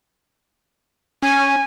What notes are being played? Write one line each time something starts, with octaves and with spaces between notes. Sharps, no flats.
C#4 G#5